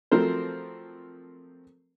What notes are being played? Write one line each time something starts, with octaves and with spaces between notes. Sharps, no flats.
F3 F#3 A3 C4 A#4 C5